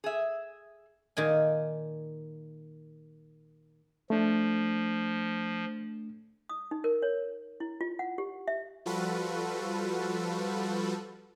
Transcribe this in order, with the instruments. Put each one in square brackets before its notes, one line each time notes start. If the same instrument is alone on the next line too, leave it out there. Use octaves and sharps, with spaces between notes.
[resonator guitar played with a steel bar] G#4 E5
[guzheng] A#2 D#3 F5 G#5
[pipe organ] F3 [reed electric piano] A3 D4
[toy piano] D#6
D#4
A#4
C#5
E4
F4
F#5
G4
E5
[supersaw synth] F3 G3 F4 F#4 A4 B4